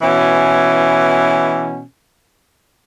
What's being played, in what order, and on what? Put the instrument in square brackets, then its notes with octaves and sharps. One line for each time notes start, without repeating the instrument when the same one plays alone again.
[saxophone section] B2 E3 C#4